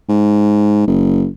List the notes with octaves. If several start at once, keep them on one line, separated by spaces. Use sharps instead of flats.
G#2
F#1